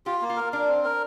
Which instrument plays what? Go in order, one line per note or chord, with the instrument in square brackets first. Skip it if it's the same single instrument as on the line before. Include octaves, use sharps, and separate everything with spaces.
[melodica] F4 [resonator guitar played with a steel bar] G4
[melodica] A#3
[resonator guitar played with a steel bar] F4
[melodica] A#4
[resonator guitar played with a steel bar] D4 [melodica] A#4
[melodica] C4
A#4